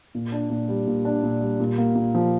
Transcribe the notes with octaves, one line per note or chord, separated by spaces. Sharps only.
A#2
D4
A#2
G3
A#2
D4
A#2
G3
A#2
A#3
A#2
F3